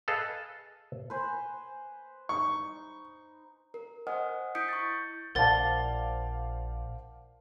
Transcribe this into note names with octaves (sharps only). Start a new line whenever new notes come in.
G#4 A4 B4 D#5 F5 A5
B4 C5 G#5
D#4 C#6
A#4
C5 D#5 F#5 G#5 D#6 F6
E4 D#6 G6 B6 C#7 D7
C#6 G6 A6
A#1 A#4 C5 D5 F5 F#5 A5 A6